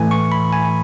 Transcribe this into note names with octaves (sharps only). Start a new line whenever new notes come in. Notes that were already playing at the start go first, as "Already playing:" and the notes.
Already playing: A2 E3 A3 G#5
C#6
B5
G#5